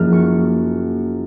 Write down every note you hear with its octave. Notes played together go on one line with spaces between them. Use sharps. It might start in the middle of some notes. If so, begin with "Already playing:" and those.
Already playing: F#1 F#2 F3 A#3 F6
C#6